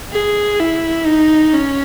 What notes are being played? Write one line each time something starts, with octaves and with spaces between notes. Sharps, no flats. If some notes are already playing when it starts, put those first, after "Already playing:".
G#4
E4
D#4
C#4